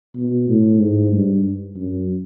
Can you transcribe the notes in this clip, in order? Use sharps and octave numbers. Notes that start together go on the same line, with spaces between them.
B2
A2
G#2
G2
F#2